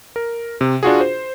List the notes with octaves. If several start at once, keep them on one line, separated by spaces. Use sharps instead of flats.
A#4
C3
D4 F4 F#4 G#4
C5